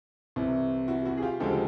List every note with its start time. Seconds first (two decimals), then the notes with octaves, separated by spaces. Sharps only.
0.36 C2 C3 E3
0.88 E4 F#4
1.05 E4 F#4
1.17 G#4
1.22 F4 G4
1.40 D2 C#3 F3 G#3 G4 A4